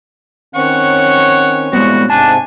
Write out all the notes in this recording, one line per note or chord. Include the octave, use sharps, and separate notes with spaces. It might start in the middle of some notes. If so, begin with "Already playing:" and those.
D#3 C4 C#4 C#5 F#5 C#6
A2 G3 G#3 B3 C4 F#4
G#2 C3 D4 G#5 A5